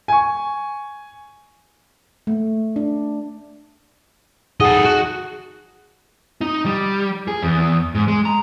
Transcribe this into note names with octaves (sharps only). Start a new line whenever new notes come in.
G#5 C#6
A3
D4
D#4 G#4 A4 D#5 F#5
F#4
D#4
G3
G#4
E2
G#2
G#3
A#5